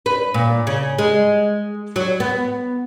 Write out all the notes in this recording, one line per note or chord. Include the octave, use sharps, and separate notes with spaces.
B4
A#2
C#3
G#3
F#3
B3